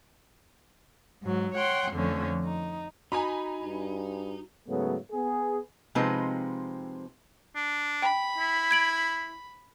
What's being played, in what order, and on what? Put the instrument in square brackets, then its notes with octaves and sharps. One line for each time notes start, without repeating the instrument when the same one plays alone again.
[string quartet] G#2 F#3
C#5 F#5 G5 C6
F2 D3 F3 A3 C#4
D#4
[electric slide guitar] D#4 [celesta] F#4 [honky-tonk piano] G#5 A#5 B5
[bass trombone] G2
[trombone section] G#2 C#3 F#3 A3 B3
B3 G#4
[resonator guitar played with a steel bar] C3 F3 G#3 C4 D#4 B4
[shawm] D4
[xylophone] G5 [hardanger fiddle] B5
[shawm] E4
[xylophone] G#6 D7 F#7